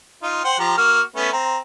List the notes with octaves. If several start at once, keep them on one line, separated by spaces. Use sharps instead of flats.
D#4 F4
C5 F#5 G5
F3 G4 A#5
A#3 F#4 F6
A3 B3 C#4
C4 A#5